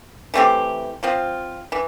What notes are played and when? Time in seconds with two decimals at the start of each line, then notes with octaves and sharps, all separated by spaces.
0.34 E3 A3 C4 G4
1.03 F3 C4 F4
1.72 E3